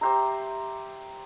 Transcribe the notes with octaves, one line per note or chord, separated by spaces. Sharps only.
G4 C5 E5 A#5